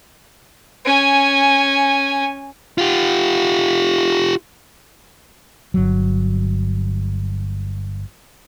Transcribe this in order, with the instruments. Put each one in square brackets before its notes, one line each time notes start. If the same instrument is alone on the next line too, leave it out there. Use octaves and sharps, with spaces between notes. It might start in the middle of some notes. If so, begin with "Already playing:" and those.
[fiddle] C#4 G#5
[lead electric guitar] F4 G4
[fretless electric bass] G1 F#3